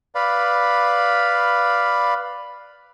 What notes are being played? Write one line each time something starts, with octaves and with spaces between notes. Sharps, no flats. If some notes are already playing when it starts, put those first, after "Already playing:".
B4 D5 F5 B5